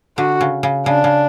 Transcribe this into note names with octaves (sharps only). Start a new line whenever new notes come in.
D3 F#4
C#3
C#3
C#3 D4
C#3